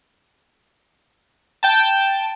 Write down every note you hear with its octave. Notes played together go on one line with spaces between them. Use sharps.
G5 A5